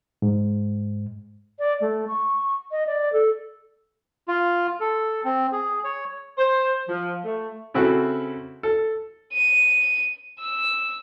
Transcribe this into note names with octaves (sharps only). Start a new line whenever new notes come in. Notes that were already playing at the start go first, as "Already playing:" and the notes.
G#2
D5
A3
C#6
D#5
D5
A4
F4
A4
C4
G#4
C#5
C5
F3
A3
C#3 C4 E4 F#4 A4
A4
D#7
E6